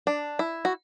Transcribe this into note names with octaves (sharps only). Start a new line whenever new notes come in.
D4
E4
F#4